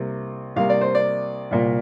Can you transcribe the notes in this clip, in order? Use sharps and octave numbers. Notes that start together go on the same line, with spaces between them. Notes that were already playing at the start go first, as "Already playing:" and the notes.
Already playing: C2 C3 A#3
C2 C3 A#3 F5
D5
C5
D5
C2 A#2 A#3